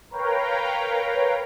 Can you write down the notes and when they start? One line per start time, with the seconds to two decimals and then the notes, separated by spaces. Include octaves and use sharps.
0.10 A#4 B4 C#5 F5 G5 A#5